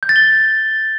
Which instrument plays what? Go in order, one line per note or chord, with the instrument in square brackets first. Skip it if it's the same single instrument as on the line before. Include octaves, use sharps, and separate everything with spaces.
[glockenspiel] G6
A6
G7